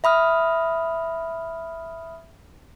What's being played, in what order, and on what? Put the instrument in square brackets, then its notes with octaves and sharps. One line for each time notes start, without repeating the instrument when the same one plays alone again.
[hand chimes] E5 B5 D#6 F6